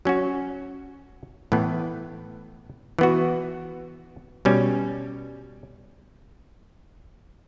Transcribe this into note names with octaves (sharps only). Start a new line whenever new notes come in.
F#3 C#4 F#4
A2 E3 B3
E3 B3 F#4
B2 G3 C#4